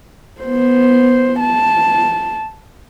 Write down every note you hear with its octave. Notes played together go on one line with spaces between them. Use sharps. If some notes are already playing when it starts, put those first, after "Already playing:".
B3 C5
A5